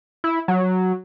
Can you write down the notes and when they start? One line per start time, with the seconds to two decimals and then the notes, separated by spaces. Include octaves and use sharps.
0.24 E4
0.48 F#3